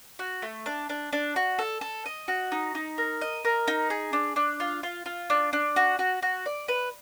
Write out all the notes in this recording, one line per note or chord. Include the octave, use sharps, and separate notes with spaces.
F#4
A3
D4
D4
D4
F#4
A4
A4
D#5
F#4
D#4
D#4
A#4
D#5
A#4
D#4
G#4
D4
D4
F4
F4
F4
D4
D4
F#4
F#4
F#4
D5
B4